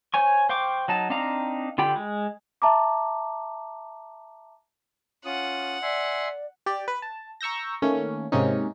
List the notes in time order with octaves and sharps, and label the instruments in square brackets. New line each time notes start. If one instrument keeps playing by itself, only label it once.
[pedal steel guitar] C5 C#5 G#5 C#6
C5 F5 G5 C#6 D6
F#3 D#4 A5
C4 D4 D#4 F5 A#5
D3 F4 G4 G5 B5
G#3
[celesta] E5 A5 A#5 D6
[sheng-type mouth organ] C#4 F4 D#6 [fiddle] F#5
[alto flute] D5 [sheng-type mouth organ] E5 G#5 C6
[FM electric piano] G4 D5
B4
A5
A#5 C#6 E6 G6 A#6
D#3 A3 A#3 C#4
G#2 C3 A#3 C#4 D#4